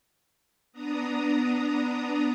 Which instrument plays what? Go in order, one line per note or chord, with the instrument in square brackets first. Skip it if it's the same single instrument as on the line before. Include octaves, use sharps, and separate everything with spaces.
[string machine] B3 D4 A#5 D#6